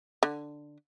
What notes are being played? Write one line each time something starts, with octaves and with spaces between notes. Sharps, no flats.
D3